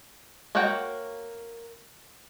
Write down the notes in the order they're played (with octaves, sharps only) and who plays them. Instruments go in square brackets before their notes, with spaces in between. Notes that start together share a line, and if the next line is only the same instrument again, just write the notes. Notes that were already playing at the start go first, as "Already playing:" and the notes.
[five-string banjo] A#3 F#4 C#5 F#5 G5